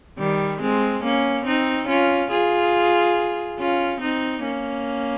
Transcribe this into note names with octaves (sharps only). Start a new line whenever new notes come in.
D#3 G3
G#3 C4
A#3 C#4
C4 D#4
C#4 F4
F4 G#4
C#4 F4
C4 D#4
A#3 C#4